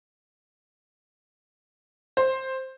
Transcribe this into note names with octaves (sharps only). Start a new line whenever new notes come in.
C5